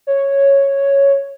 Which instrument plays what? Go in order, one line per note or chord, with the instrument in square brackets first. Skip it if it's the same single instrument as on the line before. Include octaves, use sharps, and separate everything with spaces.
[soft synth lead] C#5